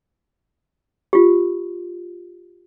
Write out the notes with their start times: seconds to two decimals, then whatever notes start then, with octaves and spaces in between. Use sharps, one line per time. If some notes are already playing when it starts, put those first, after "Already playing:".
1.13 F4 G4